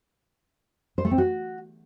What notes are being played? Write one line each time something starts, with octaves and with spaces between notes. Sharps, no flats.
C5
A3
C4
F#4